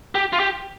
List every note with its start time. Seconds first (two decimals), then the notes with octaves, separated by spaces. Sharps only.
0.15 G4
0.33 F4
0.40 G4